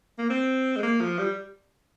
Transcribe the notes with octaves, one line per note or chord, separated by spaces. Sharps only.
A#3
C4
G#3
A#3
F3
G3